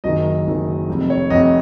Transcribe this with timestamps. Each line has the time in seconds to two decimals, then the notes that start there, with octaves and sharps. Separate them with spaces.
0.04 F#1 F#2 D#3 F#3 D#5
0.46 F#1 F#2 D#3 F#3
0.88 F1 F2 C3
1.10 C#5
1.30 F1 F2 C3 D#5